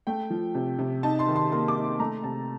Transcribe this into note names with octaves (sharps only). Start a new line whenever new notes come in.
A3 G5
F3
C3
C3
D#4 A5
C6
D#3
C6
A#3 C6
D6
D#4
C6
A3 A#5
C3 A5